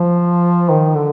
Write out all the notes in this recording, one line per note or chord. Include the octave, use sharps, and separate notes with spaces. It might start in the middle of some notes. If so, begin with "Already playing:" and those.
Already playing: F3
D#3
D3